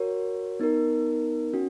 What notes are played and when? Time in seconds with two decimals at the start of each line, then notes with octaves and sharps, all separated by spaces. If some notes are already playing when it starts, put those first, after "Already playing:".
Already playing: F#4 A#4 C#5
0.60 B3 D#4 A#4
1.53 C#4 F#4